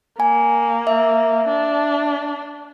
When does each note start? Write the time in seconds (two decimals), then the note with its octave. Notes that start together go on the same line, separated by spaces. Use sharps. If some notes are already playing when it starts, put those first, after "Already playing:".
0.20 A#3 G#5
0.87 E5
1.49 D4